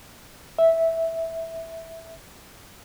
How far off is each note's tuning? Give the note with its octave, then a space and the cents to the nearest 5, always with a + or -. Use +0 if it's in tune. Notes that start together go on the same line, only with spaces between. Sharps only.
E5 -10